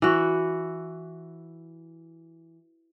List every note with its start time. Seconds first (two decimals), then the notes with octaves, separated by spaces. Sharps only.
0.02 E3 F#4